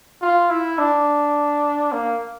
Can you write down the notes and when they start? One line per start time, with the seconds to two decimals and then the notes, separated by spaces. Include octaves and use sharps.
0.21 F4
0.50 E4
0.78 D4
1.92 A#3